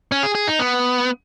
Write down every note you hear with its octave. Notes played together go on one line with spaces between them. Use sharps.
C#4
G#4
G#4
D#4
B3